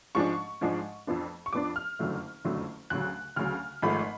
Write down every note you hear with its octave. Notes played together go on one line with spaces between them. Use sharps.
G#2 F3 G#3 D4 C#6
G#2 F3 G#3 D4
F2 F3 B3 D4
C#6
F2 F3 B3 D4 D6
F6
F#1 F2 D3 F#3 A3
F#1 F2 D3 F#3 A3
D2 C#3 F#3 F#6
D2 C#3 F#3 F6
G#1 G#2 F3 A3 B5